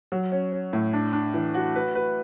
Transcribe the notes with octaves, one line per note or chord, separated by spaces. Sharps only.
F#3
C#4
C#4
A2
D4
D4
E3
F#4
B4
B4